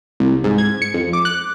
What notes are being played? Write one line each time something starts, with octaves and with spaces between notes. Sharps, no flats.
C2
G#2
G#6
C#7
F2
D6
F#6